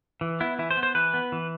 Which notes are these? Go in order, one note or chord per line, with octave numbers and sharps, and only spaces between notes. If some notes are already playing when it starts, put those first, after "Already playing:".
E3
B3 E4
E3 E4
C5
B3
C5
E3 B4
B3
E3